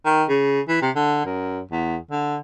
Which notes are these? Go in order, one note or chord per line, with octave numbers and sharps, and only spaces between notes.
D#3
C#3
E3
C3
D3
F#2
E2
D3